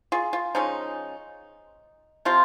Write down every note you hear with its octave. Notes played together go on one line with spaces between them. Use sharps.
F4 G#4
F4
F3 G#3 C#4 D#4
C3 F3 C4 F4